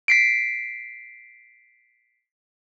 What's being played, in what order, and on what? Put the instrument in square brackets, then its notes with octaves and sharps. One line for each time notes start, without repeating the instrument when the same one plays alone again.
[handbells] B6 C7 D7